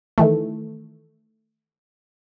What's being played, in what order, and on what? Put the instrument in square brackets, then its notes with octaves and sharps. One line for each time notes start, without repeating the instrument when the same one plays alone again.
[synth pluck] D#3 E3 A3